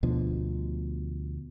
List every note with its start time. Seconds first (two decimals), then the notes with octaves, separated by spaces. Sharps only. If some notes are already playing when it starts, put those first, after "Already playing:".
0.03 D2 B2 D3 F3